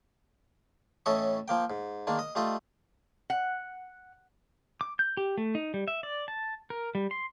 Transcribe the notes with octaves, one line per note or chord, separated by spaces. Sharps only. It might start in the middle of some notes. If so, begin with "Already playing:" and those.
A2 E3 C#4 A4 D#5 C#6
F3 A#3 G5
G#2
D#3 G#3 A#3 D4
D#5
G3 A3 F4 D#5
F#5
D6
G6
G4
A3
D#4
G3
E5
D5
A5
A#4
G3
C6